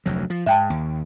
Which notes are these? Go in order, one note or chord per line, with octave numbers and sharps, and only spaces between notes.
F1 D2 F#3
F3
G#2 E5 G5 A5
D#2